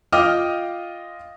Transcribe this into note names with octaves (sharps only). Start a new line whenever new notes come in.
F4 D#5 G5 D6 D#6 F6